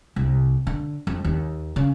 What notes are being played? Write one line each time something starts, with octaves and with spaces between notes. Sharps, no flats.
C2
D3
F2
D#2
C#3